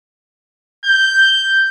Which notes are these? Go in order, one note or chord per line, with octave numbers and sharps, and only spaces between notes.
G6